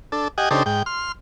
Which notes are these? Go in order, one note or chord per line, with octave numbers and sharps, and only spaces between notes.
D4 A4
G4 D#5 F#5 G#5
C#3 D4 D#4 G4 A4 C5
G#2 G5
C6 F6